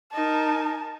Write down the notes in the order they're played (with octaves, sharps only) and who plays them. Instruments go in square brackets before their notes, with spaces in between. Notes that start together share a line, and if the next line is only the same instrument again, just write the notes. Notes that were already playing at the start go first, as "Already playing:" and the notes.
[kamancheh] D#4 A#4 [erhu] A5